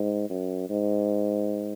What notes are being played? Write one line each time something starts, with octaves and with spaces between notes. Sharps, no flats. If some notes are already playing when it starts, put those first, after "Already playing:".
Already playing: G#2
F#2
G#2